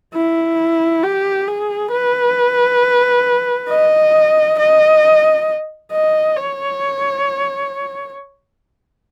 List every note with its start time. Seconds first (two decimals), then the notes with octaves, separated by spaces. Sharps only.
0.14 E4
1.03 G4
1.48 G#4
1.92 B4
3.70 D#5
4.59 D#5
5.92 D#5
6.37 C#5